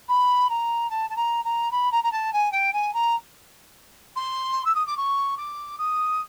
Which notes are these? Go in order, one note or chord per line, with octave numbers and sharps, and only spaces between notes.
B5
A#5
A5
A5
A#5
A#5
B5
A#5
A#5
A5
G#5
G5
G#5
A#5
C6
E6
D#6
D6
C#6
D6
D#6